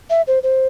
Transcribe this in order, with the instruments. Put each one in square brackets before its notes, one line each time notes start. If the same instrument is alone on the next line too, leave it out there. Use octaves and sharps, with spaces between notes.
[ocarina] E5
C5
C5